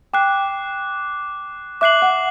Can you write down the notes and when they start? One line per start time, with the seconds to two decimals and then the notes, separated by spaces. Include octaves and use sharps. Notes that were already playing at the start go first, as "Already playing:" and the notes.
0.13 G5 D6 F#6 C7
1.81 E5 D6 F#6 C7 F#7
2.02 F#5